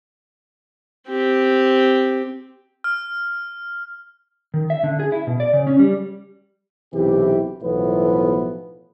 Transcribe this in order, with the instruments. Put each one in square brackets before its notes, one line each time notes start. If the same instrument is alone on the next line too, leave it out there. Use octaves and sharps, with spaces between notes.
[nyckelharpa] C4 G4
[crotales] F6
[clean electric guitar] D#3
E5
D3
G#4
E4
B2
D5
C#3
C#4
G3
[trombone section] B1 C3 E3 E4 G4
B1 A2 E3 F3 B3 B4